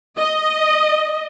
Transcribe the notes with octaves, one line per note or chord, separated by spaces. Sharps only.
D#5